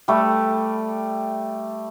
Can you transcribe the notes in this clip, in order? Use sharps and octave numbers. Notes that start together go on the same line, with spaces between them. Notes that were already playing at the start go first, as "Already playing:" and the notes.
G3 A3